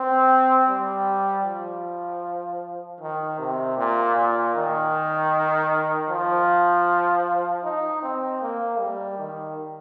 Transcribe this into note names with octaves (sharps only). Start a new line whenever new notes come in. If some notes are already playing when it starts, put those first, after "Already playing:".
Already playing: C4
G3
F3
D#3
C3
A#2
A#2
D#3
F3
D#4
C4
A#3
G3
D#3